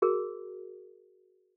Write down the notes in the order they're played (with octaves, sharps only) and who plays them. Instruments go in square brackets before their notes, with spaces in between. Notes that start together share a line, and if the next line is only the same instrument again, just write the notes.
[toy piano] F#4 G#4 A#4